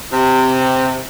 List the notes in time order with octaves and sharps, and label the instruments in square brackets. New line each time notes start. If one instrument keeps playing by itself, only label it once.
[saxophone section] C3